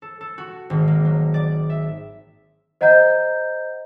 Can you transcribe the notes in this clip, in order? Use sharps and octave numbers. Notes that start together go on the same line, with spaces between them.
A4
A4
F#4
G#1
A#3
F#3
D5
E5
C5 D#5 F#5 A#5 G6